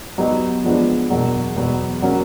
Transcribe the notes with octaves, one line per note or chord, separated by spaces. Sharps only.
F#3 B3 D#4 G4
F3 G#3 B3 D4
E2 B2 F#3 A#3
E2 B2 F#3 B3
F#3 A#3 C#4 F#4